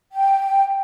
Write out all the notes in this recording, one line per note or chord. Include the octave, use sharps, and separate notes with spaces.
G5